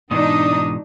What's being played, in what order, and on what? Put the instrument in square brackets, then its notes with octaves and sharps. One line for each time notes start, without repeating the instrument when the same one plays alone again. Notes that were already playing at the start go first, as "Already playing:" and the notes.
[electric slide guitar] G#2 B2 E3 [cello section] D4 D#4 [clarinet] D#6